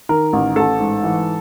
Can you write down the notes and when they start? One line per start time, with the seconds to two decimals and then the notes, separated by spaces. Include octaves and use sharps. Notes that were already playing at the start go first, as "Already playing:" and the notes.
0.09 D#3 A#4
0.33 A1
0.56 A1 A4
0.80 G#2
1.04 E3